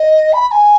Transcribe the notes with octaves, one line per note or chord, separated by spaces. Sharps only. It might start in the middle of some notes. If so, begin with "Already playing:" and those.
Already playing: D#5
B5
B5
G#5